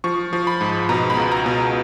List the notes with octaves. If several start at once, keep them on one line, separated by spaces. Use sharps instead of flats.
F3 C#6
F3
B5
G#2
B2 A#5
B5
C#2
A#5
B2